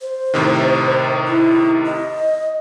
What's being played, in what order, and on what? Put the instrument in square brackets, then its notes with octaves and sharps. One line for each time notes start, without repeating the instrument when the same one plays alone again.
[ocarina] C5
[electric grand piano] A2 C3 D#3
[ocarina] E4
D#5